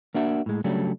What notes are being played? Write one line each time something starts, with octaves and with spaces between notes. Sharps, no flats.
A#3 D4 F#4 E5
A2 G#3
C#3 F#3 G3 A3 C#4 D4